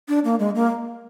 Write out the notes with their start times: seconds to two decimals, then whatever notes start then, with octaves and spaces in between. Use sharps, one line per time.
0.08 D4
0.25 A#3
0.39 G#3
0.55 A#3